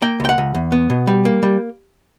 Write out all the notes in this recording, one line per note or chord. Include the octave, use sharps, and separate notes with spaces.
A#3 G5
C#2 G5
F#5
C#2
E2
B3
B2
G3
A#3
G3